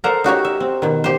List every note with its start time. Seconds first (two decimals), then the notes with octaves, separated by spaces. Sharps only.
0.04 A4 A#4 C5 D5 F#5 A#5
0.24 D#4 F#4 G4 C#5
0.45 E5
0.60 C4
0.82 B2 D#3
1.04 G4 C5